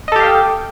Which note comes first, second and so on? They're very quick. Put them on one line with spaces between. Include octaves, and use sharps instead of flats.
D#5 A4 G4 F5 G5